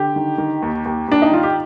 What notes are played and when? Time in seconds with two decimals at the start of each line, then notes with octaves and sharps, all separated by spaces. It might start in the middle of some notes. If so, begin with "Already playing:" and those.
Already playing: D3 G4
0.16 D#3
0.38 D#3
0.62 D#2
0.85 D#2
1.08 D#2 D4
1.22 D#4
1.32 D#3 F4
1.43 G4